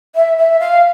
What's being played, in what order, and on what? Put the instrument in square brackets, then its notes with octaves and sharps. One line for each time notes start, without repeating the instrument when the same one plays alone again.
[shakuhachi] E5
E5
F5